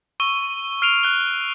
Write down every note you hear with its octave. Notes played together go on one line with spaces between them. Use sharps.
C#6 E6 D#7 G7
F6 C7 D7 D#7 F7
F#6 G7